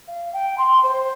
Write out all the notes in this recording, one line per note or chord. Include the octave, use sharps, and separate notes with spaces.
F5
G5
C6
C5